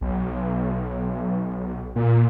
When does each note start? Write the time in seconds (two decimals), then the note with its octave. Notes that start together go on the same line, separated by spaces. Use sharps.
0.01 B1
1.96 A#2